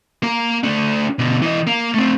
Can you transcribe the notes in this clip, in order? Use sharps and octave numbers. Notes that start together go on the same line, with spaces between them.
A#3 A#4
A3 D4
B2 D3
E3 D#5
A#3
A3 C4